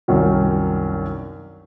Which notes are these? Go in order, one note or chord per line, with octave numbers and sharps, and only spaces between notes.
C2 F#2 D#3 F#3